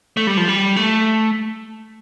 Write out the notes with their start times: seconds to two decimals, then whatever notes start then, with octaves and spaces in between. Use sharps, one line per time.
0.17 A3
0.27 G3
0.37 F3
0.48 G3
0.76 A3